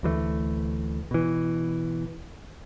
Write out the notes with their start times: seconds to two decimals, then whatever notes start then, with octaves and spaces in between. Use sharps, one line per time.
0.03 D2 E3 F#3 A3
1.11 B2 E3